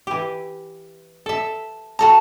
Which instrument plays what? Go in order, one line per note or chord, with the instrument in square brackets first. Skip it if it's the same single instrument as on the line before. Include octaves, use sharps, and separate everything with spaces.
[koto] E3 G4
A4 E5
[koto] F#4 A4 A#5 [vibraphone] A5